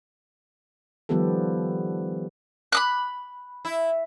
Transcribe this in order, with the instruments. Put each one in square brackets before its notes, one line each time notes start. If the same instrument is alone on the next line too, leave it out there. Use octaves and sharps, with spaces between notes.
[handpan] D#3 F3 G3 B3 G4 A4
[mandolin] B5 D#6 F#6
[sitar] E4